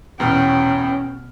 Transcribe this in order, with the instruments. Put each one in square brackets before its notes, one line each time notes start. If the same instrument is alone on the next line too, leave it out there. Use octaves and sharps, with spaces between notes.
[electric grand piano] E2 B3 F6 [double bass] B2 [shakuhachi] C#4 [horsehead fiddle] G5